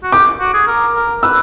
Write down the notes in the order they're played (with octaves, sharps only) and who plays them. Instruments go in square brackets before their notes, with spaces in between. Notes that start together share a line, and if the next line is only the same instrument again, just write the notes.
[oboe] F#4
[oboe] G4 [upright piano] D6
[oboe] F#4
G#4
A#4
A#4
[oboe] B4 [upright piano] E6